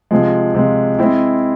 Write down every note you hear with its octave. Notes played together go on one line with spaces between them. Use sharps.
C3 F3 G#3
C3 F3 G#3
G#3 C4 E4